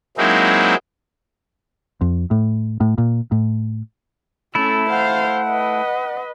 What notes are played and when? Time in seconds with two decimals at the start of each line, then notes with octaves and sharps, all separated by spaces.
0.18 F#3 G#3 A#3 C4 D#4 E4
2.01 F2
2.31 A2
2.81 A2
2.98 A#2
3.32 A2
4.55 A3 C#4 E4 A4
4.90 C5 F5 F#5
5.50 B4 D#5